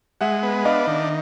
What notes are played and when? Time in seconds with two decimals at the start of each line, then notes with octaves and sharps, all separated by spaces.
0.21 G#3 E5 F#5
0.43 B3
0.65 D4 D#5 F5
0.87 D#3